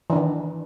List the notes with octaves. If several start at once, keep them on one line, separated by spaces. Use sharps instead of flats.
D#3 E3 D4